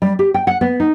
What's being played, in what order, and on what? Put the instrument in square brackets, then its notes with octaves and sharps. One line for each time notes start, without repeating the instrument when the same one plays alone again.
[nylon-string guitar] G3
G4
G5
F#5
B3
D#4